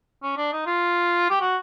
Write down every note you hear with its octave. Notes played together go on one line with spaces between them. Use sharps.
C#4
D4
D#4
F4
G4
F#4